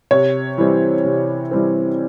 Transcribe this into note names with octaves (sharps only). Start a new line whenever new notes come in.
C3 C#5
E3 G3 C4
C3
E3 G3 C4